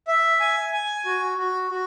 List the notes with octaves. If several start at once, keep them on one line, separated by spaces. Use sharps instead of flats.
E5
G#5
G#5
F#4
F#4
F#4